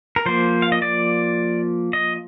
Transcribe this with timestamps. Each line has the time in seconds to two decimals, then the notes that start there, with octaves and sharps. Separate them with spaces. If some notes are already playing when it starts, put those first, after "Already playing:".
0.16 A#4
0.26 F3 A#3 C5
0.62 F5
0.72 D#5
0.82 D5
1.93 D#5